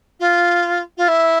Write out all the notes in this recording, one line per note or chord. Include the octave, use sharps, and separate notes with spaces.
F4
F4
E4